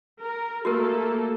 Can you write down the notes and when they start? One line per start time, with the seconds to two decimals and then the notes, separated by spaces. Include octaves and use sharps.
0.21 A#4
0.65 A3 A#3 F#4 G4 A4 A#4